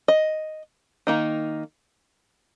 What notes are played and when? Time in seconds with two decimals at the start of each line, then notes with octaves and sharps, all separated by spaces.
0.08 D#5
1.07 D#3 A#3 D#4